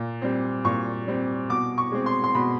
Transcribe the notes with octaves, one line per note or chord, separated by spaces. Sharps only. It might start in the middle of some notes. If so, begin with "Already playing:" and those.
Already playing: A#2
G3 C4
A#2 C#6
G3 C4
B2 D6
C#6
G#3 C4
C6
C6
B2 B5